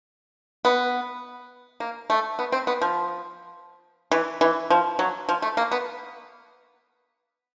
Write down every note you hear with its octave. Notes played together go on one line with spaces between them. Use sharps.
B3
A#3
A3
B3
C4
B3
F3
E3
E3
F3
F#3
F3
A3
A#3
B3